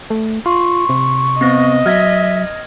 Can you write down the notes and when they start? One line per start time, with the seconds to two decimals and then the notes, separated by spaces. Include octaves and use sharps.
0.10 A3
0.46 F4 C6 C#6
0.89 C3
1.41 B3 C4 D#5 A#6
1.86 F#3 E5 F6 G#6 A#6